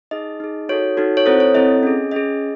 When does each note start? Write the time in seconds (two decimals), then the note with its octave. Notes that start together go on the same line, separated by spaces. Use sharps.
0.11 D#4 G#4 D#5
0.40 D#4 G#4
0.69 D#4 F#4 A4 C#5
0.97 D#4 F#4 A4
1.17 C#5
1.26 C4 E4 A4 C5
1.40 C#5
1.55 C4 E4 A4 D#5
1.83 C#4 G#4
2.11 C#4 G#4 D#5